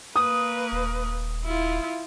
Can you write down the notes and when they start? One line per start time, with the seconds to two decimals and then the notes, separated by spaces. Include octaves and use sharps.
0.16 A#3 B4 D#6
0.72 D#1
1.45 E4 F4